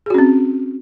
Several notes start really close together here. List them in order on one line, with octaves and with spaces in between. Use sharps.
G#4 F#4 C#4 C4